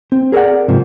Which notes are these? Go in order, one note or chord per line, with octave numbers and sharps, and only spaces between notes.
C4
G#4 A#4 B4 D5 F#5
G#2 C3 F3